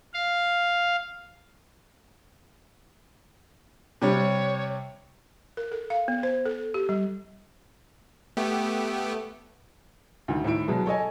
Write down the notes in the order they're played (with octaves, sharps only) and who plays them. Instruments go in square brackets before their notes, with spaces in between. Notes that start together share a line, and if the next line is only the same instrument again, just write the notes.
[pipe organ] F5
[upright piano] C3 G3 [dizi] C#5
[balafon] A#4
A4
F5
B3
C5
A4
G4
G3
[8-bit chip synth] A3 B3 G4
[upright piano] D2 D#3
A2 D#3 E4 D7
B2 F#3 G#3
A4 C#5 D#5 G#5